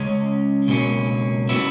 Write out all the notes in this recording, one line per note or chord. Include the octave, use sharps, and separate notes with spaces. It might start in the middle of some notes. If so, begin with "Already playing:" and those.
Already playing: C#2 C#3 G#3 C#4
C#2 B2 F#3 A#3 C#4
C#3 F#3 B3 E4